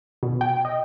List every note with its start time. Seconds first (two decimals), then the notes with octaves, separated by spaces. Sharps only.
0.23 B2
0.41 G5
0.65 D#5